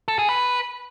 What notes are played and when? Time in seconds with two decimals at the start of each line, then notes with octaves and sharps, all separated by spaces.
0.08 A4
0.19 G#4
0.29 B4